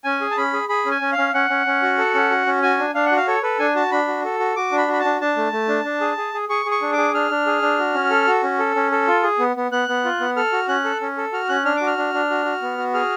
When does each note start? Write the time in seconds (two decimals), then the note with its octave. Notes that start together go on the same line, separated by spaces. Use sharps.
0.04 C#4 G#5
0.21 G#4
0.31 A5
0.37 C#4 B5
0.53 G#4
0.69 G#4 B5
0.86 C#4
0.91 G#5
1.01 C#4
1.12 F5
1.18 C#4
1.34 C#4 F#5
1.50 C#4
1.66 C#4
1.82 F#4
1.98 A4
2.14 C#4
2.30 F#4
2.46 C#4
2.63 F#4 G#5
2.79 D4
2.94 D4 F5
3.06 F#5
3.12 F#4
3.17 F5
3.28 A4 C#5
3.43 A4 B4
3.59 D4 G#5
3.76 F#4 A5
3.92 D4 B5
4.08 F#4
4.24 A4
4.39 F#4
4.56 F#4 D6
4.72 D4
4.78 B5
4.88 F#4 B5
5.00 A5
5.05 D4
5.21 D4 A5
5.37 A3
5.52 A3
5.68 D4
5.85 D4
6.01 G#4
6.17 G#4
6.34 G#4
6.49 G#4 C#6
6.65 G#4
6.71 C#6
6.82 D4
6.93 G#4 D6
7.14 D4 F6
7.31 D4
7.46 G#4
7.62 D4
7.79 F#4
7.94 C#4
8.10 A4
8.27 F#4
8.43 C#4
8.59 A4
8.76 C#4
8.92 A4
9.07 F4
9.23 G#4
9.39 B3
9.56 B3
9.71 B3 F#6
9.88 B3
10.05 F4
10.20 B3
10.36 A4 F6
10.52 F#4
10.68 C#4 F#6
10.84 A4
11.01 C#4
11.17 A4
11.32 F#4 F6
11.49 C#4 F#6
11.65 D4 F6
11.77 F#4 D6
11.87 F6
11.97 D4
12.14 D4
12.30 F#4
12.45 F#4
12.62 B3
12.78 F#4
12.94 G#4 F6